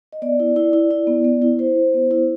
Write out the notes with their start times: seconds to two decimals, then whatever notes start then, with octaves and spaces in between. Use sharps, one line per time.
0.13 D#5
0.22 B3 D5
0.40 E4
0.56 E4
0.73 E4
0.91 E4
1.07 B3
1.24 B3
1.42 E4
1.59 E4 C5
1.76 E4
1.94 B3
2.11 E4